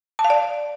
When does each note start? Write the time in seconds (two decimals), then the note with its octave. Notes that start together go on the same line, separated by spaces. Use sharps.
0.19 A5
0.24 F5
0.30 D5